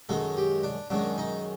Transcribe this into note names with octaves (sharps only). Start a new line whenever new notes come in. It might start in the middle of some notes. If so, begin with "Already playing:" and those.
F#2 D#3 G#3 A4
G4
D4
F#2 D#3 G#3 D4
D#4